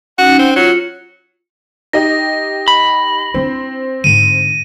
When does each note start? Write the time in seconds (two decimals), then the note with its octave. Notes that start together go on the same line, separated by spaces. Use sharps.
0.18 C#4 D#4 F#4 F#5
0.39 C4
0.56 F#3 F4 C#7
1.93 D#4 G4 D#5 A#6
2.68 B5
3.34 C4 D4 E4
4.04 G#2 D3 D#7